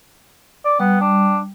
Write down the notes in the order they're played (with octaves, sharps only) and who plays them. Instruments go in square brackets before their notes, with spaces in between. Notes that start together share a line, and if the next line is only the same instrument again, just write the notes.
[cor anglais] D5
[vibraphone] G3 [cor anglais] B3
[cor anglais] D4